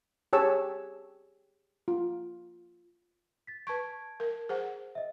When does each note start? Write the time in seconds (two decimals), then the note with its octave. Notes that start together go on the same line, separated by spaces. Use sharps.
0.33 G4 G#4 C#5 A5 E6
1.88 F4
3.47 A6 B6
3.67 B4 A5 C#6 G#6 D7
4.20 A#4
4.49 G#4 C5 F#5
4.95 D#5 E5